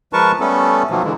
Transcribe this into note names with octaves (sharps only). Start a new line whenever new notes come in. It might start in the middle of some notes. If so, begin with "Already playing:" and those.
F3 G#3 A#4 B4 A5 C#6
G3 A3 B3 C#4 A4
B2 D#3 F3 F#3 A#3
D3 E3 G#3